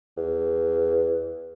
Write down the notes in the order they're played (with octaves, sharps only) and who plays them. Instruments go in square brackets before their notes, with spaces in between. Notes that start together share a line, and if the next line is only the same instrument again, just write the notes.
[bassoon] E2